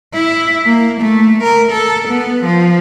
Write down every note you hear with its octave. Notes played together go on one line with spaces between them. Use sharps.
E4
A#3
A3
A#4
A4
B3
F3